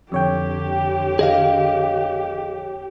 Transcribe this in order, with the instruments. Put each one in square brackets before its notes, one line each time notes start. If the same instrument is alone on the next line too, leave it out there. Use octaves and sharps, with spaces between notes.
[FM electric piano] F2 C#5 G5 [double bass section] D3 [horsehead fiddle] G4
[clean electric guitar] G#4 D#5 F5